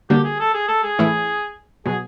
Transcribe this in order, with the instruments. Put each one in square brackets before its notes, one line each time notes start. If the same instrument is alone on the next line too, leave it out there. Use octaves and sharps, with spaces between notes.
[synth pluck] D3 G3 A#3 D4 F#4 [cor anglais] G4
[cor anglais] G#4
A4
G#4
A4
G#4
[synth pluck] A2 E3 A3 C#4 E4
[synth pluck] B2 F#3 [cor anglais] G#4